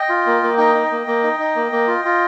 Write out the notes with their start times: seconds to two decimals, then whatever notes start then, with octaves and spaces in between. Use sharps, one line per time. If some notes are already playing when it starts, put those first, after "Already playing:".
Already playing: D#5 G5
0.09 F4
0.26 A#3
0.43 A#3
0.58 D#4 D#5 G5
0.75 D#4
0.91 A#3
1.07 A#3
1.24 D#4
1.39 D#4
1.55 A#3
1.72 A#3
1.87 F4
2.05 F4